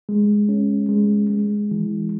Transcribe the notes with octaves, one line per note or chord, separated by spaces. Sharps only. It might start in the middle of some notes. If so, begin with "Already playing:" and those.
G#3
C#4
G#3
G#3
E3